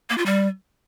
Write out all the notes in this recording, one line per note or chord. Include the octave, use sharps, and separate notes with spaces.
A#3
F4
G3